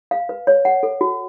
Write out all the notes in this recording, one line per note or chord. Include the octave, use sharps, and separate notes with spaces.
F5
B4
C#5
F#5
A4
F#4